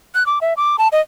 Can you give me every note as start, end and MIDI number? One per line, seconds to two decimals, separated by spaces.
0.15 0.26 90
0.26 0.39 86
0.41 0.54 76
0.57 0.77 86
0.78 0.88 81
0.92 1.00 75